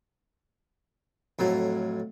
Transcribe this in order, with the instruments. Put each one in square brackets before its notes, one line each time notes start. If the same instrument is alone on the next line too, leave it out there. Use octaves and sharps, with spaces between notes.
[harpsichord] F2 A2 F#3